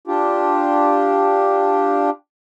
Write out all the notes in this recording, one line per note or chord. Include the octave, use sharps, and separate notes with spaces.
D4 F4 G4